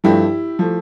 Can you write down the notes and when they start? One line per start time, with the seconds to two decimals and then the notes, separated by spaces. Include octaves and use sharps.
0.04 G2 F3 A3 E4 G4
0.59 F3 A3